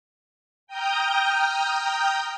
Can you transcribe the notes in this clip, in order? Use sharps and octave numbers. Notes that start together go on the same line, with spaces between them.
G5 A#5 D#6 F6 G6